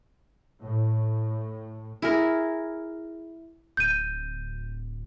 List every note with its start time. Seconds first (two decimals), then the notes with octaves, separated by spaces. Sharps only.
0.61 A2
2.02 E4 G#4 A#4
3.77 D1 G6 D#7